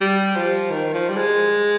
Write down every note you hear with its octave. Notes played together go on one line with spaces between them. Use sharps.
G3
F3
D#3
F3
G3
G#3